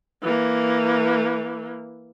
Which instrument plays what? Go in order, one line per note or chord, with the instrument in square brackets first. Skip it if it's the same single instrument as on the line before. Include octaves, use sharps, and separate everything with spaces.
[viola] E3 A#3